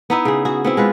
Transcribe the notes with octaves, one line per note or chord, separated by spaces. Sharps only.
B3 D#4 E4
C#3 G#4
F#4 G#4
B3 C4 E4
G#3 F4 B4